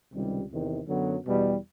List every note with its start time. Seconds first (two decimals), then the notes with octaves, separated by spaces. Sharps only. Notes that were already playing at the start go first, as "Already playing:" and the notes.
0.12 C#2 C3 D#3 G3
0.50 E2 C3 D#3
0.88 F#2 D3 F#3 B3
1.26 E2 B2 G3